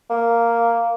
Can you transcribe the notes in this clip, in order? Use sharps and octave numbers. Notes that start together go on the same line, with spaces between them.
A#3